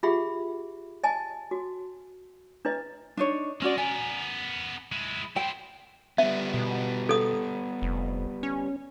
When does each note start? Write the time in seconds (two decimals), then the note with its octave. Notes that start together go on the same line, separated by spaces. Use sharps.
0.03 F4 G4 G#4 E5 F#5 B5
1.04 D#5 G#5 A5
1.51 F#4
2.65 D4 E4 B4 D#5
3.17 D4 D#4 C#5
3.62 G#3 C#4 F#4 D5
3.78 B3 A#4 G#5
4.92 G#3 E4
5.36 E4 C5 G5
6.18 G3 B3 E5
6.54 B2
7.09 A4 D#6
7.82 F1
8.43 C#4